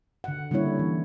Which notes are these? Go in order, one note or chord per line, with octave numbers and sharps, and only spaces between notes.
D3 F#5
D3 G3 A#3 C#4 E4 C#5
E3